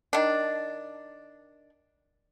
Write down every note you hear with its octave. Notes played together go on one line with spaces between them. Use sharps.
D#3 D4